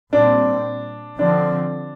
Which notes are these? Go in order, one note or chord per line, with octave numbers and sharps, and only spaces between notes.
A#2 G3 C4 D4
D3 F3 C4 D4